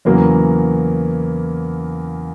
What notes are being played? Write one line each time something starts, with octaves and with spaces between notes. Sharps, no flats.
E2 C#3 F#3 A#3